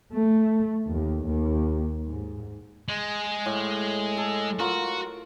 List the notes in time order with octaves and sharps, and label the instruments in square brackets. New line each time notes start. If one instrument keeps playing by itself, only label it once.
[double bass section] A3
D#2
D#2
G#2
[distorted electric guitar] G#3
[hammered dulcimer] A2
A4
[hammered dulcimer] F4 A#4 [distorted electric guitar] F#4